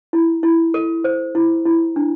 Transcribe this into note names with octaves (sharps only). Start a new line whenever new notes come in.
E4
E4
A4
C5
E4
E4
D4